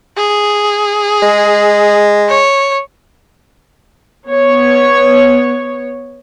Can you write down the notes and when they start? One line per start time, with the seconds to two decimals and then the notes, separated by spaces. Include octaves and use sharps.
0.17 G#4
1.22 G#3
2.29 C#5
4.28 B3 C#5